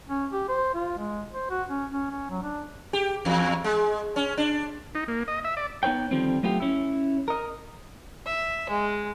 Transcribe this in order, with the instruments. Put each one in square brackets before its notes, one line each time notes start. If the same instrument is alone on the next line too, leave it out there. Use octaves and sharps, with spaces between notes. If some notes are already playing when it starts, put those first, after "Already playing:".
[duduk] C#4
G4
C5
F4
G#3
C5
F#4
C#4
C#4
C#4
F#3
D4
[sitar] G4
E2
G#3
C#4
D4
[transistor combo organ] D#4
A#3
D#5
E5
D5
[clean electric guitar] B3 D#4 B4 C#5 G5
D3 D#3 F3 G3 C4
F#3 A3 B3 F4 G4
C#4 E4
A#4 D#5
[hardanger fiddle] E5
G#3